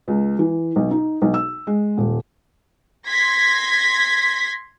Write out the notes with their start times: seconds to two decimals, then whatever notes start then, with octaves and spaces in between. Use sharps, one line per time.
0.08 C#2
0.39 E3
0.76 B1
0.91 D#4
1.22 B1
1.34 E6
1.67 G#3
1.98 D#1
3.08 C6 G#6 A#6 B6